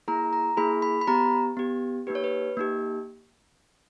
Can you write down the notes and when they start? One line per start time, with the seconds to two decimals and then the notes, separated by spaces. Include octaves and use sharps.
0.08 A#3 E4 G#4 A#5
0.33 A#5
0.57 A#3 E4 G#4 B5
0.82 B5
1.01 B5
1.07 B3 G4 A#5
1.57 B3 G4
2.07 A#3 D#4 G4 B4
2.15 C#5
2.24 B4
2.57 A#3 D#4 G4